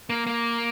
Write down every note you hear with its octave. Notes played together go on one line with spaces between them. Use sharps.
A#3
A#3